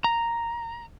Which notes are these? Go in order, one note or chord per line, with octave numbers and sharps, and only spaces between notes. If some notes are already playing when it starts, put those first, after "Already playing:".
A#5